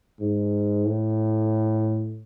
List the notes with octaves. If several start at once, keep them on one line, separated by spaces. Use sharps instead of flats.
G#2
A2